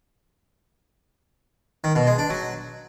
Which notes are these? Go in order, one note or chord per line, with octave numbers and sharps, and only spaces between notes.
D#3
B2
G#3
D4
F#3